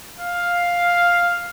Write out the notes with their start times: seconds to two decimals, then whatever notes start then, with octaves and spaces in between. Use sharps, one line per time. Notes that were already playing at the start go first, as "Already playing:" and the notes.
0.19 F5